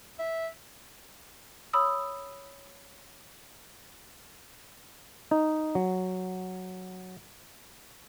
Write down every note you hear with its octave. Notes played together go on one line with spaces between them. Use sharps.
E5
C#5 B5 D#6 E6
D#4
F#3